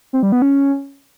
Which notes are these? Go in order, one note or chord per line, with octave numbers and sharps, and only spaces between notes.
C4
G3
B3
C#4